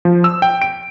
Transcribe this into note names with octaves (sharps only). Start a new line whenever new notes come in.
F3
E6
G5
D7